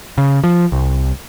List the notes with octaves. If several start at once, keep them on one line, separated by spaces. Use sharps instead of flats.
C#3
F3
C2